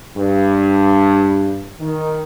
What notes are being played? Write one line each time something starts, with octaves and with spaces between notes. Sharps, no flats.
G2
D#3